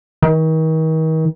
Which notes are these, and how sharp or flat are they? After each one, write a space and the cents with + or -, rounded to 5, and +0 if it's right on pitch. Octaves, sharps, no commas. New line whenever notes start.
D#3 +40